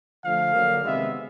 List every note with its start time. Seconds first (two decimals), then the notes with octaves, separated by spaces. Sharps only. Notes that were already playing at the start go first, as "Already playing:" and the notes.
0.24 D3 F3 A3 F5
0.53 D3 F#3 A#3
0.83 C3 D#3 G#3 B3 E5